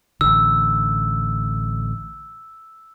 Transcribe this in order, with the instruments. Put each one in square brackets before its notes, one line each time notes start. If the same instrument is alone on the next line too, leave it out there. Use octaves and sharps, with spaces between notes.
[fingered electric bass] A1 D3 [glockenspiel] E6